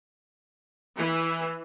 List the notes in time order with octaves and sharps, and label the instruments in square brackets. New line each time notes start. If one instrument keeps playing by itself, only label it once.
[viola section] E3